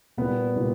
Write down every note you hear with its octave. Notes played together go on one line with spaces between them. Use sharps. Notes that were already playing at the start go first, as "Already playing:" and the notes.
A#2 G3 B3
A#2 G3